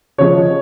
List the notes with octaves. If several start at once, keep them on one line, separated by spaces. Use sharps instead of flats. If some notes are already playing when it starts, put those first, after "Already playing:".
C#3 F3 G#3 C#5